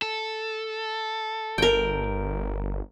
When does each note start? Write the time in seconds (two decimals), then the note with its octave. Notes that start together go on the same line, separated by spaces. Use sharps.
0.02 A4
1.58 G1 A#4 G5